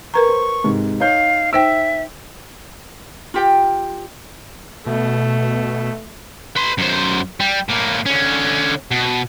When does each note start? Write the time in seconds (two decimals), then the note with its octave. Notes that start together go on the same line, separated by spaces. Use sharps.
0.14 A#4 B4 A#5 C#6
0.29 C5
0.64 G#2 C3
1.00 D#4 C#5 F5 G6
1.53 D#4 C5 E5 G5 E6 D7
3.34 F4 G4 G5
4.86 B2 A3
6.56 B4 C6
6.78 F#2 C5
7.40 G3
7.69 A2 A#3
8.06 D3 C#4
8.91 B2